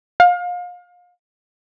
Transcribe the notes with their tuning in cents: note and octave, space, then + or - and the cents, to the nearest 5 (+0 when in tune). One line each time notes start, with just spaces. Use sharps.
F5 +30